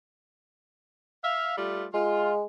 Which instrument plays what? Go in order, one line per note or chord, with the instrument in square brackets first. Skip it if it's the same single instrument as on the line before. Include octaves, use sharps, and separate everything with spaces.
[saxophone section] E5 F5
G3 A3 F4
[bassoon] G#3 [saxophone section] F4